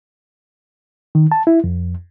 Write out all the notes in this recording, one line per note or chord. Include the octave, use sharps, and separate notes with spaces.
D#3
A5
E4
F2